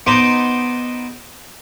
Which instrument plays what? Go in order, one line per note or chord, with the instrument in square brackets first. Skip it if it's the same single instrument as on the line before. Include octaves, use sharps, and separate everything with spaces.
[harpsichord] B3 D#4 C5 C6 D6